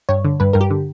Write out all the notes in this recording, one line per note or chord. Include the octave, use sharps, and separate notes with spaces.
G2 C#5
D3
G2 B4
G2 A#4
G4
D3